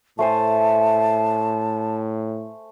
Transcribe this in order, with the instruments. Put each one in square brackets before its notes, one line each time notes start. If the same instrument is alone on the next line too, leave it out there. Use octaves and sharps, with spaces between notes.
[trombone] A2 [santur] A3 C5 G#5 [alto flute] A5